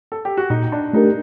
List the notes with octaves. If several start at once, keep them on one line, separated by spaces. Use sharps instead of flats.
A4
G4
F#4
A#2 D#4
D4
A3 D4 D#4 G4 A#4